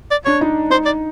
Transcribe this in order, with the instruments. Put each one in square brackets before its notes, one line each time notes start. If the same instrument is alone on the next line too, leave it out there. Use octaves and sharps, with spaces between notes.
[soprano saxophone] D5
[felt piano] D4 [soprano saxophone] C#5
[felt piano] D#4
[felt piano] D#4 [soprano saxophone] C5
[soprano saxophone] D5